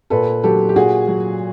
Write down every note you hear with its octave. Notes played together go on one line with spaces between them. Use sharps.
A#2 A4 B4
F#3 G4 A4
G4
A#2 F#4 G#4
F#3